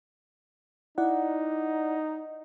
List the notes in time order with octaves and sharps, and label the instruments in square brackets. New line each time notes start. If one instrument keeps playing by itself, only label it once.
[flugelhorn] D#4 [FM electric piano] E4 D5 F#5